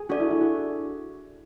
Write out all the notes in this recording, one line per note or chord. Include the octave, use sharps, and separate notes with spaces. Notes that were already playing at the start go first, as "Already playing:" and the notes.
Already playing: G#4
D4 F#4 A4 D5
E4
E4
F#4